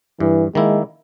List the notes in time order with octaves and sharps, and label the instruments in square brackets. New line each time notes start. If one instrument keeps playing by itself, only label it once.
[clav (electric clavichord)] G2 [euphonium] E3
[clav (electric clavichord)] D#3 A#3 E4 [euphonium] G#3